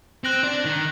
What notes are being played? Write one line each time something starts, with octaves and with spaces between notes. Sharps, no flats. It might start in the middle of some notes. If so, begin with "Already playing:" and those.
C4 F#6 A#6 F#7
D4
D#3